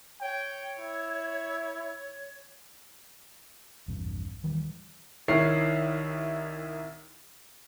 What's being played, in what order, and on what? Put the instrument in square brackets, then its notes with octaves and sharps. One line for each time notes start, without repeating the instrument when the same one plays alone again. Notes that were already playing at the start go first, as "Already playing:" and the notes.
[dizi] C#5 [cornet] G5
[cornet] E4
[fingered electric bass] A#1 E2 G2 C3
D#1 D#3 E3 G3
[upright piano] C2 D#3 E4 C#5 C7